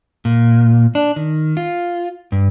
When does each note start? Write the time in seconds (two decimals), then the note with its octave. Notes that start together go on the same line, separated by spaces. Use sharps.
0.25 A#2
0.95 D4
1.16 D#3
1.57 F4
2.32 G2